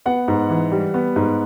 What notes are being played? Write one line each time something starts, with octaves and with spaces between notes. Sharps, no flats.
B3 F#5
G#2
E3
G3
B3
G#2